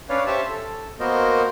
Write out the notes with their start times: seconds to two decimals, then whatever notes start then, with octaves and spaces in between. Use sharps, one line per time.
0.09 C#4 D4 B4 C#5 D5 F5
0.26 G4 C5 C#5 E5 G5 A5
0.49 A4
1.00 A#3 B3 F#4 A#4 C5 D#5